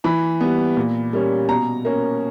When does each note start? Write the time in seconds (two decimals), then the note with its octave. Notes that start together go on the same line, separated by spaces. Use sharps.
0.04 E3 B5
0.41 G3 B3
0.77 A#2
1.13 G3 A#3 C#4
1.49 B2 A#5
1.85 A#3 C#4